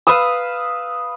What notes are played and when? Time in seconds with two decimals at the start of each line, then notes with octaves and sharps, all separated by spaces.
0.07 B4 F5 D#6 E6